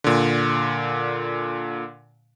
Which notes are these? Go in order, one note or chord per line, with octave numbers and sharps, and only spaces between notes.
A#2 D3